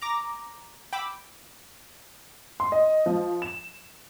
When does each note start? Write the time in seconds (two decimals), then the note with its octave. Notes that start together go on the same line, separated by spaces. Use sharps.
0.02 A#5 D6 A#6
0.93 G5 B5 D6 E6
2.60 C6
2.72 D#5
3.06 F3
3.42 E7